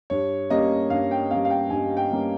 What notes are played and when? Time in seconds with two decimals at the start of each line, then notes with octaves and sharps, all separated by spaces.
0.10 G2 C#5
0.50 G3 A#3 C#4 D#5
0.90 G2 F5
1.11 G5
1.31 G3 A#3 C#4 F5
1.45 F5
1.50 G5
1.70 G2 G#5
1.97 G5
2.11 G3 A#3 C#4